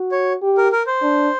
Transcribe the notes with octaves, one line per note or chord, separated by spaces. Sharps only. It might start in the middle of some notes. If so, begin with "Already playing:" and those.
Already playing: F#4
C#5
G4
A#4
A#4
C5
D4